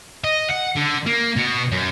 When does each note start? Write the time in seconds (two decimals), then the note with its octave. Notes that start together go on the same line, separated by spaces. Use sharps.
0.24 D#5
0.50 F#5
0.76 D3
1.06 A#3
1.36 B2 F#4
1.72 F#2